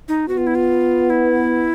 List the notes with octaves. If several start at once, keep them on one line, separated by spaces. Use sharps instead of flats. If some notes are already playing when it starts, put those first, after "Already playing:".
D#4
B3 F#4
F4
E4
F4
E4